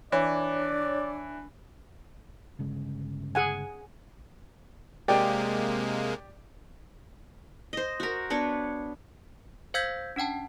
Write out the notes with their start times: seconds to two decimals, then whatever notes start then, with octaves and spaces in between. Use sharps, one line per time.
0.12 E3 D4 C#5 D5
2.59 G1 C#3 G#3
3.35 G#4 F#5 G#5
5.08 C3 G#3 A#3 G4 D5 G5
7.73 C5 D#5
8.00 F#4 A#4
8.30 B3 D4 C#5
9.74 C5 F5 E6 G6 G#6 B6
10.16 C#4 D4 F#5 G5 A5